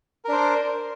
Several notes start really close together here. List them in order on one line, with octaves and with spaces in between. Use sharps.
A#4 D4 C5